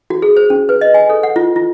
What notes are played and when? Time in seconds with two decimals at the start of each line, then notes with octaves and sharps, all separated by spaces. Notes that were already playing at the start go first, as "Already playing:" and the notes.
0.10 F#4
0.22 G#4
0.37 C5
0.50 C#4
0.69 B4
0.81 D#5
0.94 G#5
1.10 A4
1.23 F#5
1.36 F4
1.56 F4